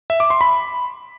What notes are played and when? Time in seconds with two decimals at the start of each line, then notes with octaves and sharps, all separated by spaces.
0.10 E5
0.20 D6
0.30 C6
0.41 B5